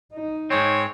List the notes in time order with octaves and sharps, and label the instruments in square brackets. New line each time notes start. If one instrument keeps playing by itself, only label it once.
[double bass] D#4
[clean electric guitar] G#2 G#3 C4 [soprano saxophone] C#5